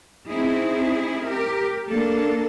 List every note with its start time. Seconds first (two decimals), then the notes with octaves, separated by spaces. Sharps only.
0.27 C4 C#4 D#4 E4 G#4
1.26 G4 A#4
1.88 A#3 D4 A4